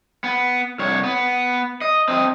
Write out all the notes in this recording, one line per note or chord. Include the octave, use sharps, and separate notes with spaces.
B3
C2 C#5
B3
D#5
C4 D#5